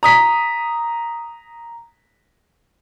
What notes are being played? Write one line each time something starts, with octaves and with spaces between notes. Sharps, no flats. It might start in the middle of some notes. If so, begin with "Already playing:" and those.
A#5 D#6 B6